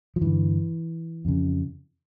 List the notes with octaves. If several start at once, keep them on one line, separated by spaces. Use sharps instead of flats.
F3
G2 D3 E3
F2 C#3